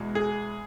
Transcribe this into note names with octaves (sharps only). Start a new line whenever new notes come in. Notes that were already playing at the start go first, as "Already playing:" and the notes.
Already playing: E2 B2 G#3
G#4